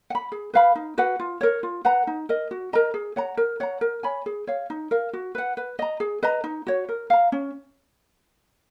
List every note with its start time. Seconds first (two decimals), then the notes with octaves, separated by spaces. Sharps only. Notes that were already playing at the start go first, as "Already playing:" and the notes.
0.10 F#5
0.15 B5
0.32 G#4
0.54 B4 F5 B5
0.75 D#4
0.98 F#4 B4 F#5
1.20 F4
1.41 A#4 C#5
1.63 F4
1.85 B4 F#5 A#5
2.07 D#4
2.29 A#4 D#5
2.51 F#4
2.73 A#4 D#5 A#5
2.94 G#4
3.16 C#5 F#5 A#5
3.37 A#4
3.60 C#5 F#5 A#5
3.81 A#4
4.03 C#5 G#5 B5
4.26 G#4
4.47 C#5 F5
4.70 D#4
4.91 A#4 F5
5.13 F#4
5.35 B4 F#5
5.57 B4
5.79 D#5 A#5
6.00 G#4
6.23 B4 D#5 A#5
6.44 D#4
6.67 F#4 C#5
6.89 A#4
7.10 F5 A#5
7.32 C#4